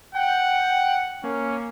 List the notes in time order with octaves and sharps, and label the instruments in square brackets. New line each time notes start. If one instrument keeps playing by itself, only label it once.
[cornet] F#5 [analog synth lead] G5
[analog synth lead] A#3 [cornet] C#4